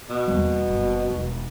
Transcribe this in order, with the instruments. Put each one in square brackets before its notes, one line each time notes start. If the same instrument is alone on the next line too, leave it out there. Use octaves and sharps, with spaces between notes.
[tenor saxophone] B2
[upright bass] E2 A#3 [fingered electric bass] G3 B3
[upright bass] F#1
E1 D#3